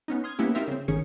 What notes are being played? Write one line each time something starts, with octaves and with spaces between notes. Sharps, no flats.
B3 C#4 D#4
C6 D#6 F6 G#6
A#3 B3 C#4 E4 G4
C4 D#4 F4 G4 A#4 E5
C#3 C4
G#1 D#3 C#4 G#4 C#7